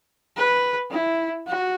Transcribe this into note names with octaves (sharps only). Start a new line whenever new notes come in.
B4
E4
F#4